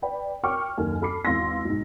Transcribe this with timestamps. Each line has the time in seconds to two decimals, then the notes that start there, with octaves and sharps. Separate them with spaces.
0.02 B4 D5 G5 B5
0.43 A#4 C#5 G5 C#6 D6 F6
0.78 F#1 D#2 A4 A#4 G#5
1.02 A4 B5 D6 C7
1.25 G#1 E2 F5 C6 E6 A#6
1.65 B1 G#2